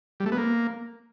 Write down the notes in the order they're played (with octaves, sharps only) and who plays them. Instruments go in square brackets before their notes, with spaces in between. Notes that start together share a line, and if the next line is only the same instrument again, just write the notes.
[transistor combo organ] G3
A3
B3
A#3